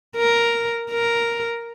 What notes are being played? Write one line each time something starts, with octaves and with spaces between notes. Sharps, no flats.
A#4
A#4